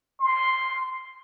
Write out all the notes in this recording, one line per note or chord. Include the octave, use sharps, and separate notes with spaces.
C6